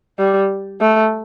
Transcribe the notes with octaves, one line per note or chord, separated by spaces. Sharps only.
G3
A3